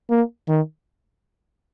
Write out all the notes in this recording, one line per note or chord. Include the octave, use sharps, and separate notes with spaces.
A#3
D#3